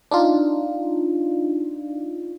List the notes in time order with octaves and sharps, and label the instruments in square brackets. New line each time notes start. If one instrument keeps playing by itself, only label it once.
[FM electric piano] D4 D#4 F4